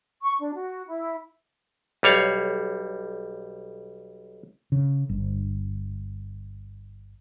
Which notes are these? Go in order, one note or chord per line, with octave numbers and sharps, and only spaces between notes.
C#6
D4
F#4
E4
B1 G3 C#5 F5
C#3
G1